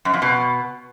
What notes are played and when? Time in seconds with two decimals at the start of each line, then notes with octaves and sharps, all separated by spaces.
0.05 F#2
0.14 F2
0.22 B2